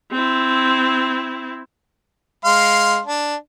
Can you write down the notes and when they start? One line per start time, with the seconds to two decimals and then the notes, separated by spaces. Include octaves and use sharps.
0.11 C4 E4
2.45 G#3 F5 C6
3.05 D4